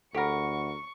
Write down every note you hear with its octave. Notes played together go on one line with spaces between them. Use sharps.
D2 G4 A4 A#4 F#5 B5 C#6